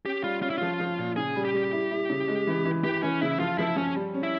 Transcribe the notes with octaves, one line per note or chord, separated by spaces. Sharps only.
C#4 G4
G3 F4
C#4 F4
E4
F3 F4
F3
A#2
C#3 G#4
G3
G4
G3
E4
E4
C#3
G#3
E3
E3
E3 G4
E3 C#4
C#3 E4
F3 F4
F3 E4
F3 C#4
G3
C#4
E4